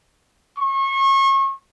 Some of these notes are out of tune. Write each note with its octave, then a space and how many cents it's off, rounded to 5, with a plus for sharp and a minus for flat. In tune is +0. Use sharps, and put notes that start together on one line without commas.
C#6 -35